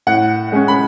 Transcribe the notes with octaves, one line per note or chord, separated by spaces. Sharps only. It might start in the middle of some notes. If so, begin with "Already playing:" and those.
A2 F#5
G#3 C#4
B5